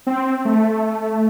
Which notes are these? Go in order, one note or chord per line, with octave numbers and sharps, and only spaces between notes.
C4
A3